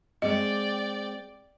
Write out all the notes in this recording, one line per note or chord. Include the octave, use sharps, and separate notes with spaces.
G#3 C4 F#4 D5 D#5 G5